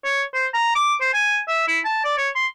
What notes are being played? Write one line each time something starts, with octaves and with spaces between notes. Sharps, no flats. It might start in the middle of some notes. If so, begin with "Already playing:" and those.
C#5
C5
A#5
D6
C5
G#5
E5
E4
A5
D5
C#5
C6